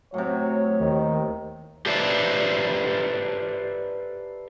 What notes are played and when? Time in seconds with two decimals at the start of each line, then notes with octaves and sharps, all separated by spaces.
0.14 A2 C3 F#3 C#5
0.79 D#2 D#3
1.86 G4 A4 B4 C5 D5 E5